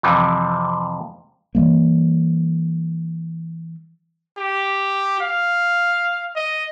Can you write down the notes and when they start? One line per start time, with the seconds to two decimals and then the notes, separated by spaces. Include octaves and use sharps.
0.03 F2 C3 E3 F3
1.55 E3 F3 G3 A#3
4.38 G4
5.20 F5
6.36 D#5